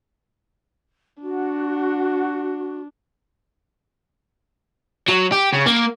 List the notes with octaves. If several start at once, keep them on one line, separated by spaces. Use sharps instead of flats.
D4 F#4
F#3
G4
C#3
A#3